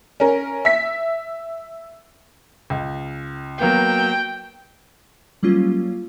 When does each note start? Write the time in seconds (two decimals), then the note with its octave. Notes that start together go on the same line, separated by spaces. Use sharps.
0.20 C#4 A#4
0.65 E5 B6
2.70 C#2
3.60 F#3 A#3 B3 G5
5.43 F#3 G3 A#3 C#4 F4